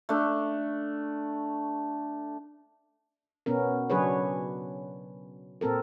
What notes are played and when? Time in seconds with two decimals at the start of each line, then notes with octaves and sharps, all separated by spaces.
0.09 A3 D4
3.46 B2 B3 C#4 A#4
3.90 C#3 F#3 D4 G#4 B4 C#5
5.61 A#2 C4 A4 A#4